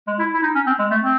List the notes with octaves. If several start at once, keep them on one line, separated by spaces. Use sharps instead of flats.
G#3
E4
E4
D#4
C#4
C4
G#3
A3
C4